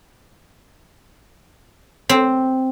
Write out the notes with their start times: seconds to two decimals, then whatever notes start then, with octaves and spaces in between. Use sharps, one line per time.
2.09 C4